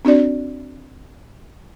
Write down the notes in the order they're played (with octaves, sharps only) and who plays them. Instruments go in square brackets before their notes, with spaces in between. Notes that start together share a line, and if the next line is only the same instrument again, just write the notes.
[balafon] C4 D4 F#4 D5